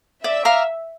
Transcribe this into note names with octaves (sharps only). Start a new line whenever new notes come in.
D5 E5
F5 A#5 D6